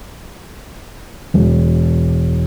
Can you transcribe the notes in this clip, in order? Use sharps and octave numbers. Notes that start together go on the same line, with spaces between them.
E1